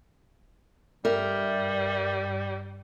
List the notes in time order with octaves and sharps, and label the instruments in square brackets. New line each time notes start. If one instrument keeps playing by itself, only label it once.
[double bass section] G2 [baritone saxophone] G3 [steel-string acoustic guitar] A#4 E5